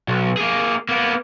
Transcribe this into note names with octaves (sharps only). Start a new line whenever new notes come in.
B1
A#3 G#4
A#3 B3